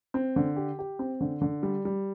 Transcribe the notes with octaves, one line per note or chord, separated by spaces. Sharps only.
C4
D3
G4
G4
C4
D3
D3
G3
G3